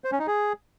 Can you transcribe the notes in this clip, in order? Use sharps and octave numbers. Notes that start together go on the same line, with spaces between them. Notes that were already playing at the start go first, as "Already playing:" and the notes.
C5
C#4
D#4
G#4